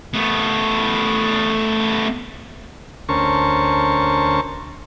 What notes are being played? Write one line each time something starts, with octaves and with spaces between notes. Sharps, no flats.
A3 B3
D2 C#4 A#4 C5 A5 C#6